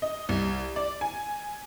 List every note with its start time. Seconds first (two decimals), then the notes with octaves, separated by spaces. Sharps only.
0.02 D#5
0.29 C2
0.76 D5
1.01 G#5